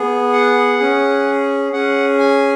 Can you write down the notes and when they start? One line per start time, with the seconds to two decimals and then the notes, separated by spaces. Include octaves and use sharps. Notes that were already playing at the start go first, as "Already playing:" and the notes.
Already playing: B3 G#4
0.33 F#5
0.79 C#4 G#4
1.72 C#4 G#4 F#5
2.19 G#5